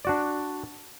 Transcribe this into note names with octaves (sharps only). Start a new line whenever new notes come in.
D4 F#4 D5